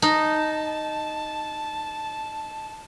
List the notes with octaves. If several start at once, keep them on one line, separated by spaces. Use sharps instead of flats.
D#4 A5